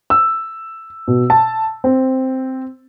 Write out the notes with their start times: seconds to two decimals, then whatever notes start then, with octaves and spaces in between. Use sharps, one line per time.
0.10 E6
1.08 B2
1.30 A5
1.84 C4